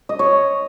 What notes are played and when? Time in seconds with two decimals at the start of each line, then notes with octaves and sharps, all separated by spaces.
0.09 D#5
0.19 C#5